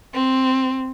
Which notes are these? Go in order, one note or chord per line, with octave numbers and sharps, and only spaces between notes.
C4